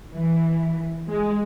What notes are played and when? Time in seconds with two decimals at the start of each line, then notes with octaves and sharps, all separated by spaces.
0.13 E3
1.08 G#3